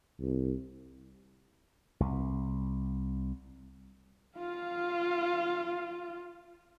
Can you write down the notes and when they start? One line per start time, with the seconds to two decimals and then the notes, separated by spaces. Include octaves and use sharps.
0.20 C2
2.00 C2
4.38 F4 F5